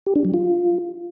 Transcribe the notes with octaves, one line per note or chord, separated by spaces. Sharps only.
G4
D4
F#3
F4